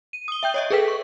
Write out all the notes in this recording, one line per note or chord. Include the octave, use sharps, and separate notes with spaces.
D#7
D#6 G7
E5 G5 G6
C#5 D#5 E5
G#4 A4 B4 G5 B6
C#6